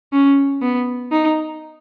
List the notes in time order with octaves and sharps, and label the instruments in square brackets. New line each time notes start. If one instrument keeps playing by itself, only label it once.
[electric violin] C#4
B3
D#4